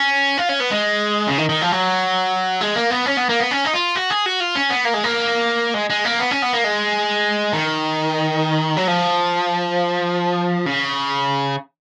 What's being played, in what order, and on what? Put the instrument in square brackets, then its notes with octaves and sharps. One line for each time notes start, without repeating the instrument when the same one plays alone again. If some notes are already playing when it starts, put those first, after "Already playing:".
Already playing: [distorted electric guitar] C#4
F4
C#4
B3
G#3
C#3
D#3
D#3
F3
F#3
G#3
A#3
B3
C#4
B3
A#3
B3
C#4
D#4
F4
F#4
G#4
F#4
F4
C#4
B3
A#3
G#3
A#3
G#3
G#3
A#3
B3
C#4
B3
A#3
G#3
D#3
F#3
F3
C#3